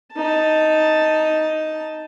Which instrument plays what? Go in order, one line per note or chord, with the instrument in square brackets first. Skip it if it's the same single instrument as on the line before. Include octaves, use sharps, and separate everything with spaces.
[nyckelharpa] D#4 A5